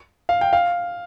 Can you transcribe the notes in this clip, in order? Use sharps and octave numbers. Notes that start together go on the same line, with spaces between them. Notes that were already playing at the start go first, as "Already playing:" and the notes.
F5
G5
F5